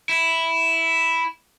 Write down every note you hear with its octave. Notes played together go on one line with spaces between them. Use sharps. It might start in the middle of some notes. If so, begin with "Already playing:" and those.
E4